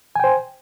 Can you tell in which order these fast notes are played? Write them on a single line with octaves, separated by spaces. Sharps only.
G#5 G5 C5